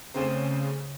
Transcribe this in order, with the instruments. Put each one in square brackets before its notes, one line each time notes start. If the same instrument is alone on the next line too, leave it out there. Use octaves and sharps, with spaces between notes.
[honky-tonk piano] D2 C4 C5 [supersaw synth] C#3